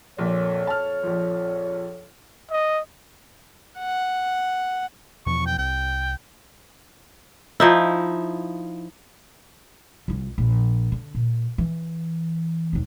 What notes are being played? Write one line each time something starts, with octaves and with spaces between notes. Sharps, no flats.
A#1 F2 A#2 A4 C#5
A5 F6
A#1 F3
D#5
F#5
E2 B2 F3 C#6
G5
C2 G5
F3 D#4 E4
C2 F4
A#1
D3
A#2
E3
E1 D#2